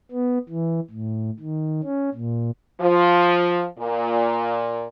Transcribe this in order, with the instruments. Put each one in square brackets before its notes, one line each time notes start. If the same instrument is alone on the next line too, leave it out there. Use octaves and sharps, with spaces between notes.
[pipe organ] B3
E3
A2
D#3
C#4
A#2
[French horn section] F3
A#2